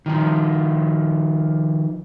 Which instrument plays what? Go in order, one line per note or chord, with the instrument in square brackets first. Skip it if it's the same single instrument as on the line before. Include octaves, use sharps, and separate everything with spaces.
[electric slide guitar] D#3 F3